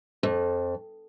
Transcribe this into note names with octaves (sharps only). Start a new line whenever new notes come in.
F2